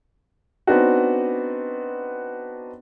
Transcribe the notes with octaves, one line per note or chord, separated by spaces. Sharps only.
B3 C4 D4 D#4 F#4